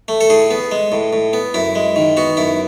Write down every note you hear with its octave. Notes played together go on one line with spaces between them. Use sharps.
A3
A4
A2 G#4
B3
G#3
A2
A2
B3
F#2 E4
G#3
D#3
B3 F#4
F#2 E4